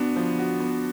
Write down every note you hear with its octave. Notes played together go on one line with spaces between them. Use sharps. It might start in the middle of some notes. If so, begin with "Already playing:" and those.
Already playing: B3 D4 F#4
F3
F#4
B3